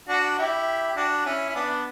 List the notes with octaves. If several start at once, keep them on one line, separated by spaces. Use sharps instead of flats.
D4 F#4
E4 G4
G4
D4 F#4
C#4 E4
E4
B3 D4